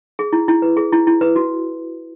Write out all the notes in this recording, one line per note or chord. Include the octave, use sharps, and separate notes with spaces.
G#4
E4
E4
B4
G#4
E4
E4
B4
F#4